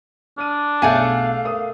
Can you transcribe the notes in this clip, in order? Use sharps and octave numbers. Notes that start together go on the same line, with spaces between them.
D4 F6 D#7
B1 A3 G#4 F5 F#5 G#5
A#4 D#6